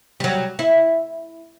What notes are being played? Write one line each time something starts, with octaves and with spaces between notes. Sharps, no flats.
F#3 G3
E4